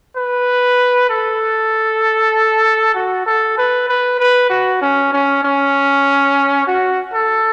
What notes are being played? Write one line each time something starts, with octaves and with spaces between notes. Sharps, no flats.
B4
A4
F#4
A4
B4
B4
B4
F#4
C#4
C#4
C#4
F#4
A4